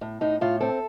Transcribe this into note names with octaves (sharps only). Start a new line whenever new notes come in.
A2
A2 D#4
A2 F4
C4 A4